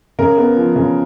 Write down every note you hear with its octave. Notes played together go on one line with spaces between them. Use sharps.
C#3 A#4
B3
F3
C#3